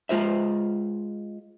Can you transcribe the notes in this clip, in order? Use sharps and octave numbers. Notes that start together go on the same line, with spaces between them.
G#3 F4 C5 E5